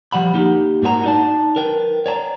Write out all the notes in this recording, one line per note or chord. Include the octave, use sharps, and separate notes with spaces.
F3 G3 F#5 B5
A#3 D#4 G4
G#2 A#3 F#4 B4 A#5
D#4 D5 A5
A#4 B4 G5
C#5 D5 A5 A#5